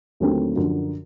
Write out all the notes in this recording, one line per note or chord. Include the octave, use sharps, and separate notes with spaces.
D#2 D3 F#3 A3 C4
F#2 D3 F3